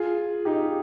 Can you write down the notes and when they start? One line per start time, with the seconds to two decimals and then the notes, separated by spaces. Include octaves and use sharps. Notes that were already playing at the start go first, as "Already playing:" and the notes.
Already playing: F4 G#4
0.45 D#4 G4